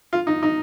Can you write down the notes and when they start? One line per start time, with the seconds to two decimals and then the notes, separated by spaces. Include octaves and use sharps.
0.13 F4
0.27 D#4
0.43 D#4